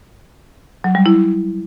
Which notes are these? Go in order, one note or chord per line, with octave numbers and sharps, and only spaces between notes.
F#3
G3
E4